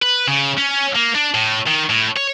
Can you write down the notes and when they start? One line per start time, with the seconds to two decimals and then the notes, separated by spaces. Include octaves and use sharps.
0.02 B4
0.28 C#3
0.58 C#4
0.95 A#3
1.15 D4
1.34 A2
1.67 D#3
1.90 A2
2.17 C#5